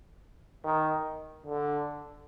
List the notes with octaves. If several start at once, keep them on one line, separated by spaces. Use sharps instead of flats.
D#3
D3